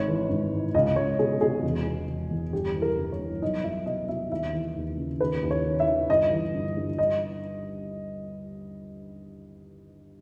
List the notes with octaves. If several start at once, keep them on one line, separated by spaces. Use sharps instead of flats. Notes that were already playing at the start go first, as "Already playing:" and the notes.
Already playing: G#1 C#5
E3
G#1
G#2
C#2 D#5
C#2 C#5
B2 G#4
B2 G#4
E1
B2
E1
E2
G1 G4
E3
A#4
G1
C#5
G2
B1 D#5
B1 E5
B2 D#5
B2 E5
D#2 E5
E3
D#2
C#3
D#2 B4
D#2
C#5
D#3
E5
D#3
G1 D#5
E3
G1
G2
D#5